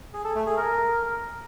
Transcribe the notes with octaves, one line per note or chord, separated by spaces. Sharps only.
G#4
A4
A3
G#4
A#4